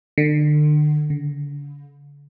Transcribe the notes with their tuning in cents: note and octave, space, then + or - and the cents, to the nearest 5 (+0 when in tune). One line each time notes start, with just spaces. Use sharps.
D3 +35
D3 -40